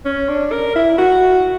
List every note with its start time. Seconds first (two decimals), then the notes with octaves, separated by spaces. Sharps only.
0.05 C#4
0.29 D4
0.52 A#4
0.76 E4
0.98 F#4